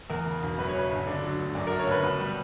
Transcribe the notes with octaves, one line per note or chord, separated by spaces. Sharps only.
E2 A#4
C#3
E1
F#2 B4
C#5
C#3 B4
G1
D3 D5
F#3
D2
F#2 D5
A#4
D3
C#5
F#1 B4
B2 B4
G3